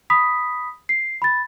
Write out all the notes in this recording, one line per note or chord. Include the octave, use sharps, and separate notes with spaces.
B5 D#6 B6
C7
B5 A6